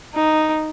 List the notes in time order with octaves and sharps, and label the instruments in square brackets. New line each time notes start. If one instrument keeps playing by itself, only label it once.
[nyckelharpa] D#4